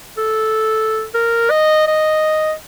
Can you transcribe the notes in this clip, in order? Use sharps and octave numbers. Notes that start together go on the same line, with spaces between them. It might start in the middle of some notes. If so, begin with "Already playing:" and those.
A4
A#4
D#5
D#5